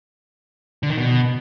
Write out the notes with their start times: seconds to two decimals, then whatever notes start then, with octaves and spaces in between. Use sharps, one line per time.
0.83 D3
0.90 D#3
0.98 B2